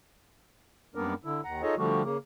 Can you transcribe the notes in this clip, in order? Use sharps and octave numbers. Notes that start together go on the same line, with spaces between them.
F#2 G3 A#3 B3 D4 A#4
D3 E4
D#2 F#5 A#5
D#4 F4 G#4 A4 C#5 D#5
D3 F3 G3 A3 F#4
C#3 A#3